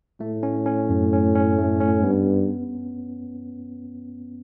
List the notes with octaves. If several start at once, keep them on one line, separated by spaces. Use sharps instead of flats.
A2 A3
C#4
C#4
F#2
C#4
C#4
A3
C#4
G2 B3